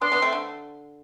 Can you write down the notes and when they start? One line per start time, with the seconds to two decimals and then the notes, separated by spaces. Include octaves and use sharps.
0.01 B3 D4 C6
0.12 B3 D4
0.22 A3 C4
0.33 D3